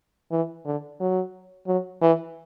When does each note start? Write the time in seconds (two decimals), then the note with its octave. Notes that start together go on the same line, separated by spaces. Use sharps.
0.31 E3
0.65 D3
1.00 F#3
1.67 F#3
2.01 E3